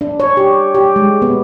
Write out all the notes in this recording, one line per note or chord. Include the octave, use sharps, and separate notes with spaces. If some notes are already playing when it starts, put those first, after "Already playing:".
D4
C#5
G4
G4
G#3
B3